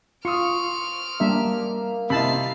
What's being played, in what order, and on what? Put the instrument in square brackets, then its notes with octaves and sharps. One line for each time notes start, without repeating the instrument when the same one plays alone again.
[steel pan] F4 [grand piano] C6 D#6 [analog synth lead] C#6 [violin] F6 D7
[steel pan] G3 D4 E5 [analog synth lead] A#3
[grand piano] C3 D#5 [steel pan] E4 A5 B5 [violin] F5 C7